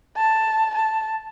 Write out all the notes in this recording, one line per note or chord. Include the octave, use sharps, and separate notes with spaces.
A5
A5